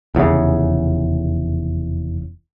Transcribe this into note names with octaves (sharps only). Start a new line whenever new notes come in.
F1 E2 G2 C#3